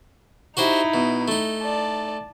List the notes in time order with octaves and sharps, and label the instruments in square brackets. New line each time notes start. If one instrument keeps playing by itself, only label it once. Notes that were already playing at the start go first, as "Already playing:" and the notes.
[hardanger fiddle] D#4 E4 [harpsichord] F#4 G4 C5
[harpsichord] B2
A3 D#4
[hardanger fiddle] D5 A5